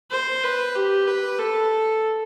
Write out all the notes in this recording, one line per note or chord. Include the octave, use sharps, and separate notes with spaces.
C5
B4
G4
B4
A4